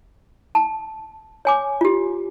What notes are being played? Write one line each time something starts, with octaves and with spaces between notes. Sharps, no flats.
A5
C#5 G#5 D6
F4 G4